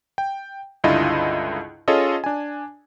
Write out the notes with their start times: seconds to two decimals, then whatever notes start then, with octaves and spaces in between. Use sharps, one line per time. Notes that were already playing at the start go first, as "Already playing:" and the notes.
0.18 G5
0.84 C#2 G2 D3 E4 F4 D#5
1.88 C#4 F4 G#4 A4 C#5 D#5
2.24 D4 G#5